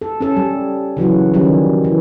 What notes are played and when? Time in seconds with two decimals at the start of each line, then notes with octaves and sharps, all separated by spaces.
0.01 A4
0.20 C#4 A4
0.37 G3
0.97 C#3 E3 F#3 F#4
1.34 D#3 F3 G3 C#4
1.84 E3